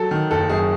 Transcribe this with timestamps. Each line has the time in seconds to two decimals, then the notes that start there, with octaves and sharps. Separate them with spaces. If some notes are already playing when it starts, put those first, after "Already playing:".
Already playing: F#3 A4
0.11 D#3
0.31 F#1 A4
0.49 F#2 G#4